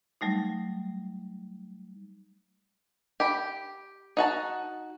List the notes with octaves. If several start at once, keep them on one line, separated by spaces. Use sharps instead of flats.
F#3 G3 A3 D#4
G4 G5 B5
D#4 F#4 A5